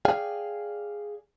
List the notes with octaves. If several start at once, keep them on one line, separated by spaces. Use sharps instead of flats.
G#4 D5 F5 G5 G#5